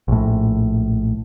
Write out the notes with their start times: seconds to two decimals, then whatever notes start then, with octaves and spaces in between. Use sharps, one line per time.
0.08 A#1 A2